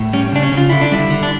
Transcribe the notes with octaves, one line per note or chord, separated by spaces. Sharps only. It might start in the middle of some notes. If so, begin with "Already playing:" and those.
Already playing: A2
G3 C#4
C#3 D4
C#4
C#3
F4
D3 E4
D4
G3 E4
D3
D4